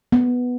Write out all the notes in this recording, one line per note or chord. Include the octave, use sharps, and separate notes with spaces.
B3